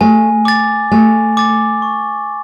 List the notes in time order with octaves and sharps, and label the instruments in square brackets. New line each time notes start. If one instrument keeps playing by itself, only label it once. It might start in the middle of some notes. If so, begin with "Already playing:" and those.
[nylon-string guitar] A3 [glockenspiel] G#5
[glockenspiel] D6 A6
[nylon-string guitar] A3 [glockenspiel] G#5
[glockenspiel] D6 A6
C#6